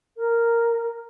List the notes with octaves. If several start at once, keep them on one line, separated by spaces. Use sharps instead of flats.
A#4